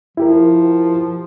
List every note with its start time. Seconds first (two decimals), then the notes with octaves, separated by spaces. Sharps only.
0.17 F3 E4 G4 A#4